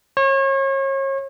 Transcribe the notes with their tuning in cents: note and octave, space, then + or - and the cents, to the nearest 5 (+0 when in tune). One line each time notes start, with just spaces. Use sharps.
C#5 -35